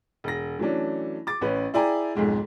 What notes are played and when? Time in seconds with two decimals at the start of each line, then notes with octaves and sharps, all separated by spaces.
0.24 E1 A#6
0.59 E3 F#3 A3 C#4 D4
1.27 D6 A6
1.41 A1 C#4 B4
1.74 E4 G#4 D5 G5 G#5 A#5
2.15 B1 F2 G#2 G#3